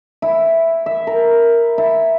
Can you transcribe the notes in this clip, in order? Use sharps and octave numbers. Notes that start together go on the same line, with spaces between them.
E4
E5
A#4
E4